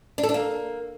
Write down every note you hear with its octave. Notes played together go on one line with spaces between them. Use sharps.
D4
A4
D4
A#3